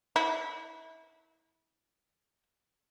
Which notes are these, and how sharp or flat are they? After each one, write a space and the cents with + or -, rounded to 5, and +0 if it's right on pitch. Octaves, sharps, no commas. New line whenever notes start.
E4 -30